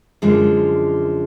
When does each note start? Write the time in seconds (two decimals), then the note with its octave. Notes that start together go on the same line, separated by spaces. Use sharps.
0.22 F#2 D3 F3 G#3